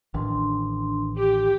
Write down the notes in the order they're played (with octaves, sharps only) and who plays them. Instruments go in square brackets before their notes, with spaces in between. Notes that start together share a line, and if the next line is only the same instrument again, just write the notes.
[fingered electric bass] A1 D#3 [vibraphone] D4 C6
[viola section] G4